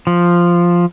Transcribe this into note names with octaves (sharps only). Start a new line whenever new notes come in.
F3